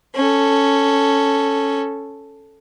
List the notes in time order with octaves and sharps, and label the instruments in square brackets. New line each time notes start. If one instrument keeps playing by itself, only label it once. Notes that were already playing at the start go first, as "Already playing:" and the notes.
[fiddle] C#4 A4